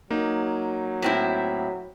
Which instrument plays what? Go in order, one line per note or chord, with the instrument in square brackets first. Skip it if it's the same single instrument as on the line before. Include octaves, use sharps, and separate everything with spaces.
[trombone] F#3 [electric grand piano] A#3 D#4
[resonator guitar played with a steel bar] A2 C4 E4